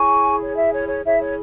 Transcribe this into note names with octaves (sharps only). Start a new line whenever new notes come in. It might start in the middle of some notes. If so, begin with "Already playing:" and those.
Already playing: E4 G#4 C#5 G#5 C#6
C#5
E5
C#5
C#5
E4 G#4 C#5 E5
C#5